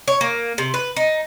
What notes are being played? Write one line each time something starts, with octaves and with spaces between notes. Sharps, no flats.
C#5
A#3
C3
B4
D#4